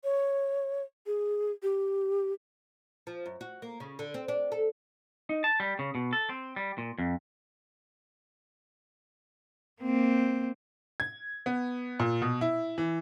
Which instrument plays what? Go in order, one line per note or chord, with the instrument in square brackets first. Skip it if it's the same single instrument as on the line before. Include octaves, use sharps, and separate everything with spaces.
[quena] C#5
G#4
G4
[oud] F3
F#2
F#4
A#3
C#3
D3
C4
D4
A4
[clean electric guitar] D#4
A5
G3
C#3
B2
A4
C4
G3
A#2
F2
[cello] A#3 C4
[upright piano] G#6
B3
A#2
B2
E4
E3